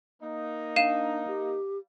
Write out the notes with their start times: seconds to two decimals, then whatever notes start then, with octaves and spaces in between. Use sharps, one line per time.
0.23 A#3 D#4
0.76 D4 F5 D#7 E7
1.27 G4